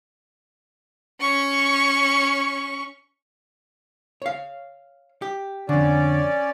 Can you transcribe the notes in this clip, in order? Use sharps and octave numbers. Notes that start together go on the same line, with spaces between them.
C#4 C#6
C#5 F5
G4
F2 D3 C#4 D5